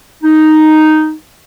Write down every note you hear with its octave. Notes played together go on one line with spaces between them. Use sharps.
D#4